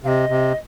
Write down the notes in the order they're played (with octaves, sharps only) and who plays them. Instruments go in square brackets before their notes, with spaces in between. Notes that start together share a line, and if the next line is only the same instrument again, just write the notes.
[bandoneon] C3 [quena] F5
[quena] D#5
[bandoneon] C3